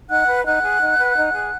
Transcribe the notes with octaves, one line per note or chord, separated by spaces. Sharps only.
D#4 F#5 F#6
B4
D#4 F#5 F#6
G#4
D#4
B4
D#4
G#4